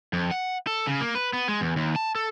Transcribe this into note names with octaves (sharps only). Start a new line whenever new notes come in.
F2
F#5
A4
C#3
A#3
B4
B3
G#3
E2
D#2
A5
A4